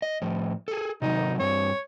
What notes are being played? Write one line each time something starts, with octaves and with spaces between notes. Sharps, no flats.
D#5
A2 F3
G#4 A4
C3 D#3 F#3 D#4
G2 C4 C#5